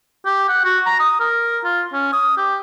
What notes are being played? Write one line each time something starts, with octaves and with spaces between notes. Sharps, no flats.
G4
F#5
F#4
A#5
D#6
A#4
F4
C#4
D#6
G4